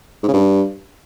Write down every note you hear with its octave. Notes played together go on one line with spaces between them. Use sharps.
G#2
C#3
G2